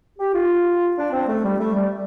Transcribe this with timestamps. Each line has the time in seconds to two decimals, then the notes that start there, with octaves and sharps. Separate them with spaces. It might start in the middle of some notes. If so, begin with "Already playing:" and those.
0.19 G4
0.34 F4
0.97 D4
1.12 C4
1.27 A3
1.43 G3
1.58 A3
1.75 G3